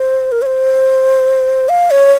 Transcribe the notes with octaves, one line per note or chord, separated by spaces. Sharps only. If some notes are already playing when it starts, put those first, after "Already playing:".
Already playing: C5
A#4
C#5
C5
F5
C#5